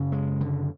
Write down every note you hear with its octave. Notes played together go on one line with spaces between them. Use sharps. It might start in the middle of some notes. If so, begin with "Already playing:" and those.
Already playing: F#2 C#3
G#3
D3